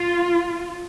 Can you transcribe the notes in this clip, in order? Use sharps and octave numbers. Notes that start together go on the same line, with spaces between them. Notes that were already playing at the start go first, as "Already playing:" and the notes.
Already playing: F4